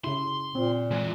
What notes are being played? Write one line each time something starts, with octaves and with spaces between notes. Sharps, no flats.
C#3 E4 C6
A#2 C4
E3 G#3